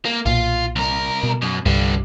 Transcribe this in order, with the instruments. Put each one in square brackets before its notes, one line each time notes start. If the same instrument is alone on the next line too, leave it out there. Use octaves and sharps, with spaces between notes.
[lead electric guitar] A#3
[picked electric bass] B1 A#2 [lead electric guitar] F4
[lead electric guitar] C2 A#4
[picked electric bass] B2
[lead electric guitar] F#2
[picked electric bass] C2 G2 [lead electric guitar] D3 G3